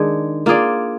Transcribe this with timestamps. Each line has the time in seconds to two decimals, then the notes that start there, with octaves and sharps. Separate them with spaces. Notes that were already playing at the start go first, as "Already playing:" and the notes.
Already playing: D#3 G#3 D4 G#4
0.46 A#3 F4 G#4 D5